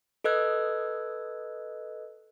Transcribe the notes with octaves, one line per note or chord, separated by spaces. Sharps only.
A4 B4 D#5 E6 F#6 G#6